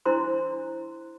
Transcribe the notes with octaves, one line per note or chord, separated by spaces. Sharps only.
D4 E4 C5 A#5 C6